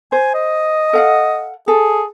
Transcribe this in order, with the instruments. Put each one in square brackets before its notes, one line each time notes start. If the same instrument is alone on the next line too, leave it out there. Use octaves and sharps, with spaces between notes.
[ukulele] C5 [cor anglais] G#5
[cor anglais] D#5
[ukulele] A4 F5 F#5
[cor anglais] G#4 [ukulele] A4